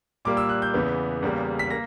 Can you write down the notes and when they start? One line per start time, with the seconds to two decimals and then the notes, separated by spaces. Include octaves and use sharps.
0.25 A#2 G3 A#3 D6
0.37 E6
0.49 F#6
0.62 G6
0.74 E2 C#3 E3 B3
1.22 E2 C#3 G3 A#3
1.59 B6
1.70 A#3 A#6